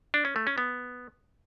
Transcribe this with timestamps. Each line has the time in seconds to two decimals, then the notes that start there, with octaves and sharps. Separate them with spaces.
0.14 D4
0.25 C#4
0.36 A3
0.47 C#4
0.58 B3